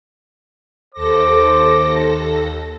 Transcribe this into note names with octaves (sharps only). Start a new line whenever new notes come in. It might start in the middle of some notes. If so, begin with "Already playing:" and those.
D#2 A4 C5 D6 A#6